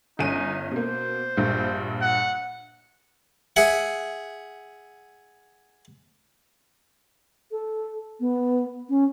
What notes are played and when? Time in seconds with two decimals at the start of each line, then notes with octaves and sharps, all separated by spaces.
0.19 G1 C#4 D#4 D#7
0.72 B2 A#3 C5
1.37 A#1 G2
2.02 F#5
3.56 G#4 E5 F#5
7.51 A4
8.20 B3
8.89 C#4